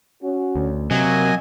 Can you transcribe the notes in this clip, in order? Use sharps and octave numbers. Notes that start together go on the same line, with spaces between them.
C#4 F#4
D2
C3 F#3 A#3 D#5 G#5